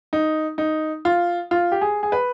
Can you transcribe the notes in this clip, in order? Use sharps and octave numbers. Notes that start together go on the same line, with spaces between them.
D#4
D#4
F4
F4
G4
G#4
G#4
B4